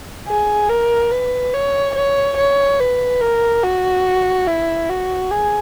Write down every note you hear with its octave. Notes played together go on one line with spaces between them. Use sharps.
G#4
A#4
B4
C#5
C#5
C#5
B4
A#4
F#4
E4
F#4
G#4